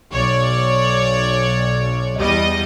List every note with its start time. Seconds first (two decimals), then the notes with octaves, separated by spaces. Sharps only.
0.11 B1 C#5 D5
2.19 E2 G3 D#5